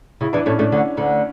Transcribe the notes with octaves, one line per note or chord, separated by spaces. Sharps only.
C#3 E4
E2 E3 D4
A2 A3 C#4
A2 A3 D4
D2 D3
D2 D3